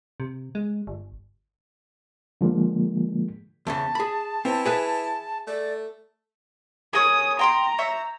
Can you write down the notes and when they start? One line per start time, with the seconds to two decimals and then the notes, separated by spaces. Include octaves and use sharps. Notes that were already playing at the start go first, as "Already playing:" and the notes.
0.20 C3
0.55 G#3
0.87 G1
2.41 D3 F3 G#3 A#3
3.67 E2 A#2 C#3 A5
3.95 G#4 B5
4.45 E3 C4
4.65 G#4 B4 E5
5.47 A3 D5
6.93 G#4 A#4 C#5 D#6
7.39 G5 A#5 C6 D#6
7.79 C#5 E5 G6